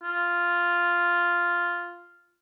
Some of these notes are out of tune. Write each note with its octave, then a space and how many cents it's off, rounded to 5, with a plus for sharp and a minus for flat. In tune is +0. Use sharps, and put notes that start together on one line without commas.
F4 -5